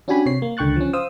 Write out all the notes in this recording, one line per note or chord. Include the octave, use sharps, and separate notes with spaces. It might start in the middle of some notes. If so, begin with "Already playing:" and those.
C#4 D4 F#4 G4 G#5 B5
C3 C#5 C7
A#3
C#2 D3 G5 C#6 F#6 A6
F3 C#4
C5 F5 D#6 E6